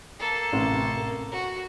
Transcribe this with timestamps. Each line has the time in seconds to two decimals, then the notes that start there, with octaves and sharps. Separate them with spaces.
0.20 A#3 A4
0.53 A1 C3
0.97 A#4
1.32 F#4